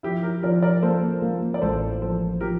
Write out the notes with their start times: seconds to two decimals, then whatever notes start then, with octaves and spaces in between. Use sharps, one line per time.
0.03 F3 E4 G4
0.23 G4 A#4
0.43 F3 A#4 D5
0.62 A#4 D5
0.83 A#3 A4 C5
1.22 A#3
1.54 D5
1.62 A1 A4 C5
2.01 F3 A4 C5
2.41 F3 G4 A#4